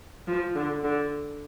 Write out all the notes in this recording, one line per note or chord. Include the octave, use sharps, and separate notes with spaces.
F3
D3
D3